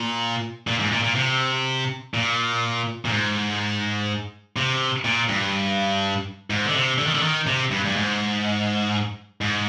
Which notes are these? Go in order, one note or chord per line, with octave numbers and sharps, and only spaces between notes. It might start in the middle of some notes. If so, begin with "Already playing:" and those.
Already playing: A#2
A#2
G#2
A#2
A#2
C3
A#2
A#2
G#2
C3
A#2
G2
G#2
D3
C3
D3
D#3
D3
D#3
C3
G2
G2
G#2
G#2